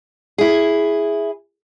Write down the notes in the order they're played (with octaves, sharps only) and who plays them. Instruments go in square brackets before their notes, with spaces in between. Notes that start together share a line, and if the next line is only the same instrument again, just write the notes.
[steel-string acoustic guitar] E4 G#4